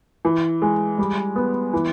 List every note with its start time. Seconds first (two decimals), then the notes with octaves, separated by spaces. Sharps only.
0.25 E3
0.62 G#3
0.98 G3
1.36 B3
1.73 E3